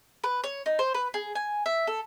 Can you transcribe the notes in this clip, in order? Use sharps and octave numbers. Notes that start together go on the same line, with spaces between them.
B4
C#5
D#4
C5
B4
G#4
G#5
E5
A4